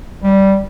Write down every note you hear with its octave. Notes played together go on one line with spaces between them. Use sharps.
G3